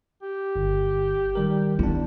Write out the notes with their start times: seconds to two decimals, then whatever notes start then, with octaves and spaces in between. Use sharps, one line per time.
0.22 G4
0.56 G1
1.35 D#3 G3 A#4
1.79 B3 D4 E4